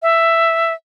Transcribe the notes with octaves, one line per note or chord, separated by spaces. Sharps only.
E5